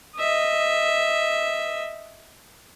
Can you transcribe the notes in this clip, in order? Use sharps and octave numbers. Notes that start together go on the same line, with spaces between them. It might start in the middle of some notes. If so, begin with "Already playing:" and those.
D#5 E5